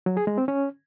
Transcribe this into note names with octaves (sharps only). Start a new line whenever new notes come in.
F#3
G#4
G#3
C4
C#4